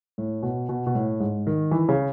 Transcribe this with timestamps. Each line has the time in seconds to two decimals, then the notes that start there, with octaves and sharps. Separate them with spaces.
0.18 A2
0.43 B2
0.69 B2
0.86 B2
0.95 A2
1.20 G#2
1.47 D#3
1.71 E3
1.89 C#3